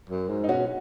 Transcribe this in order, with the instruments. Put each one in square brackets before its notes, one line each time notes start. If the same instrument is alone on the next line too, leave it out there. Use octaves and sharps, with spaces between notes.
[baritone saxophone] F#2
G#2
[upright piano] D#4
[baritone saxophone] B2 [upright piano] C#4 F#4